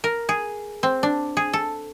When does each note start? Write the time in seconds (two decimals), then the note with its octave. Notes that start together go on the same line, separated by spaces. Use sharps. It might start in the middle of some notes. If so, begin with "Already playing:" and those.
0.04 A#4
0.29 G#4
0.83 C4
1.03 D4
1.37 G#4
1.53 A4